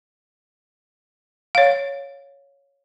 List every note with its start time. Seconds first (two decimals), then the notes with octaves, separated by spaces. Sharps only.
1.55 C#5 F5